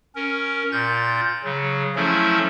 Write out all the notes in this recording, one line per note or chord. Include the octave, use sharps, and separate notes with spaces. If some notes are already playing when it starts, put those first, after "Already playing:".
C#4 A#4
A#2 G6 A6
C#3 F#3
F3 F#3 A3 C#4 E4 A4